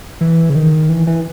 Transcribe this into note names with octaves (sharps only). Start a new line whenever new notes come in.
E3
C#3
D#3
E3
E3